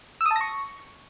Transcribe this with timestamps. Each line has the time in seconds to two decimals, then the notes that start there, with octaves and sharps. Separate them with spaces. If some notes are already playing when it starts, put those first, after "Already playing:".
0.21 E6
0.26 D#6
0.31 A5
0.36 A#6
0.41 C#6